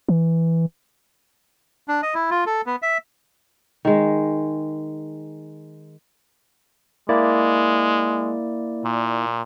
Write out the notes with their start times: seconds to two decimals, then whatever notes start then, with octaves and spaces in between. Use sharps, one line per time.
0.09 E3
1.88 D4
2.03 D#5
2.14 E4
2.30 F4
2.46 A4
2.66 B3
2.82 E5
3.85 D#3 G#3
7.09 G#3 A#3 E4 D5
8.85 A#2